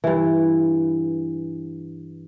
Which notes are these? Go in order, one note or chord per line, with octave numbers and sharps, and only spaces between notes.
G2 E3